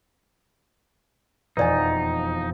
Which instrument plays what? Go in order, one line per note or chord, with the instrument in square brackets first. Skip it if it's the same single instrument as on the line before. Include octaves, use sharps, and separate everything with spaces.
[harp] E1 F2 A6 [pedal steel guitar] D#4 [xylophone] B4 D5 G#5